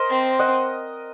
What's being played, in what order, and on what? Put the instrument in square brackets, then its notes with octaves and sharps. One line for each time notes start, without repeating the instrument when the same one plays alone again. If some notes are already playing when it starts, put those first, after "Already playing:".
Already playing: [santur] A#4 C5 D#5
[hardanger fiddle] C4
[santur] D#5 F#5